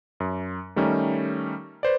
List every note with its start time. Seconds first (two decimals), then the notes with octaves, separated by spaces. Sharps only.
0.20 F#2
0.76 D#3 G3 A3 C#4 D#4
1.83 B4 C5 D5